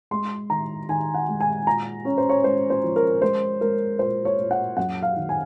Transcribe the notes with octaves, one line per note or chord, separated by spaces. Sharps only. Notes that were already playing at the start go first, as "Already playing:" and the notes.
G#3 C6
D#3 A#5
D#3 G#5
F#5
G#3
G#5
A#2 A#5
C#4 C#5
C5
C#5
G#3 C5
C5
F3
A#4
G#3 C5
G#3 A#4
A#2 C5
C#5
A#2
F#5
F#2 F#5
F5
D#3
G#5